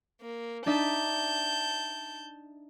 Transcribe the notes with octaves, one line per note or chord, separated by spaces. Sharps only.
A#3
D4 D#4 E5 A5 G6